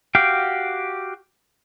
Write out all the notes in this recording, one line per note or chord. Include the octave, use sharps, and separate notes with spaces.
F#4 G4 F5 G5